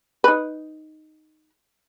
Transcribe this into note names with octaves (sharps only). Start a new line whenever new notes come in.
D#4 B4